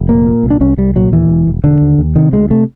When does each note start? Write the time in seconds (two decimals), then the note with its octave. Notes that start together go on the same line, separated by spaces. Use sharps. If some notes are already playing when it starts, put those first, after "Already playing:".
Already playing: F1
0.08 A#2 A#3
0.26 A#2
0.43 C2
0.50 D4
0.60 C2 C#4
0.77 C2 G3
0.95 A#2 F#3
1.12 D#2 E3
1.29 E1
1.47 E1
1.64 E1 D3
1.81 D#2
1.98 D#2
2.16 C3 D#3
2.33 D2 G#3
2.51 C3 A3